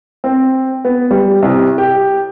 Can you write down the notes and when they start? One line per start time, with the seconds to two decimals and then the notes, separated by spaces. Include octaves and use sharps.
0.24 C4
0.85 B3
1.11 G3
1.42 C2
1.78 G4